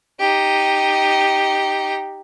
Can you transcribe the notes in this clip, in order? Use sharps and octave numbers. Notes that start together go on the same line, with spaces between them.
D#4 G4